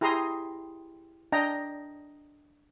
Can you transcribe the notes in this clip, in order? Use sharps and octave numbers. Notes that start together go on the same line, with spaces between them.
E4 G4 G#4 A#5 C6 D#6
D4 D#5 G5 A#5